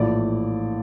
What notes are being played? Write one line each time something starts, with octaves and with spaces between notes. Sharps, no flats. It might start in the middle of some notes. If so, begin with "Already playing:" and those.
Already playing: A#1 A2 E3 D5